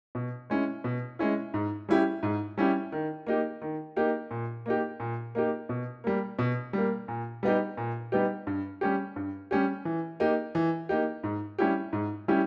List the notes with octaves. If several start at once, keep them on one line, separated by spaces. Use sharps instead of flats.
B2
G#3 C#4 E4
B2
G#3 C#4 E4
G#2
G3 C#4 E4 G4
G#2
G3 C#4 E4 G4
D#3
A#3 D#4 G4
D#3
A#3 D#4 G4
A#2
A#3 D#4 G4
A#2
A#3 D#4 G4
B2
G3 A#3
B2
G3 A#3
A#2
G3 B3 D#4 G4
A#2
G3 B3 D#4 G4
G2
G3 C#4 G4
G2
G3 C#4 G4
E3
A#3 D#4 G4
E3
A#3 D#4 G4
G#2
G3 C#4 E4 G4
G#2
G3 C#4 E4 G4